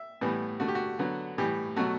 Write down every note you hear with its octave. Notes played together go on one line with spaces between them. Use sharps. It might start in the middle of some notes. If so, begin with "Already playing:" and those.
Already playing: E5
A2 E3 G3 B3
D3 A3 F#4
G4
F#4
D3 F#3 B3
A2 E3 G3 G4
B2 F#3 A3 F#4